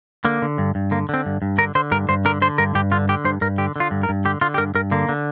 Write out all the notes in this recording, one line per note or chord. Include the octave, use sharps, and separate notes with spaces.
D3 A#3
D3
G2
G2
D3 A#3
D3 C4
G2
G2
D3 A#4
D3 C5
G2 A#4
G2 C5
D3 A#4
D3 C5
G2 A#4
G2 G4
D3 F4
D3 G4
G2 C5
G2 A#4
D3 G4
D3 F4
G2
A#4
G2
D3 G4
D3 F4
G4
G2 A#4
G2 A#4
D3 A#3
D3